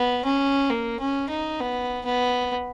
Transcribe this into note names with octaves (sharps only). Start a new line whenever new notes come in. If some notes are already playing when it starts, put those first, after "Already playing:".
Already playing: B3
C#4
A#3
C#4
D#4
B3
B3